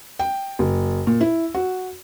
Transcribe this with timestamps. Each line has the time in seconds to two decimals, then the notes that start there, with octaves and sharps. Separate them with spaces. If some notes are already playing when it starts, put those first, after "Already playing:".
0.19 G5
0.59 F#1
1.07 A#2
1.21 E4
1.55 F#4